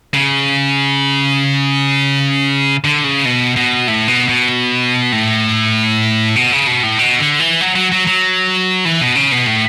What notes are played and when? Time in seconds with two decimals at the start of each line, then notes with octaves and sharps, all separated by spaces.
0.14 C#3
2.84 D3
3.04 C#3
3.25 B2
3.56 B2
3.88 A2
4.08 B2
4.29 B2
5.12 A2
6.36 B2
6.52 C#3
6.67 B2
6.83 A2
6.99 B2
7.19 D3
7.40 E3
7.61 F#3
7.76 F#3
7.92 F#3
8.07 F#3
8.85 E3
9.01 B2
9.15 C#3
9.32 B2
9.47 A2